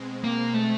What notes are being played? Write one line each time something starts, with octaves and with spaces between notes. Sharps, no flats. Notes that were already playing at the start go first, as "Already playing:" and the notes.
Already playing: B2 G#3 C4
A#3
A3